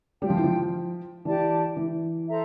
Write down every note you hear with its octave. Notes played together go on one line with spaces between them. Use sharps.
G3 F4 C5 G5
F3
E3
F3
E3 G4 D5 A5
E3
A4 C5 E5 A#5